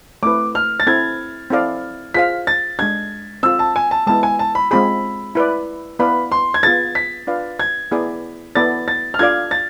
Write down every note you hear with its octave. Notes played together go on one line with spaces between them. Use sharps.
A3 C4 E4 B4 D6
F6
A6
C4 E4 A4 G#6
C4 E4 A4 D5 F5
F4 G#4 C5 F5 B6
A6
G#3 D4 A4 G#6
C4 F4 A4 E6
A5
G#5
A5
G#3 B3 E4 A5
G#5
A5
B5
G#3 C4 F4 G#4 B5
E4 B4 D5
B3 E4 B4 D5 F5 B5
C6
G#6
B3 F4 G#4 B4 A6
B6
D4 F4 B4 D5 F5
G#6
B3 E4 G#4 D5
B3 E4 A4 D5 A6
A6
F6
D4 F4 A4 D5 F5 G#6
A6